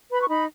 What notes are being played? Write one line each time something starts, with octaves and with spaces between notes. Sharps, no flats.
B4 B5
C#6
D#4 B5